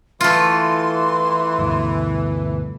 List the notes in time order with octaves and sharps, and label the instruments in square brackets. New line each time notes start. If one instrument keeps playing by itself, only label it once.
[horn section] E3 [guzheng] A3 F4 [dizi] C6
[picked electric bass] D2 G2 B2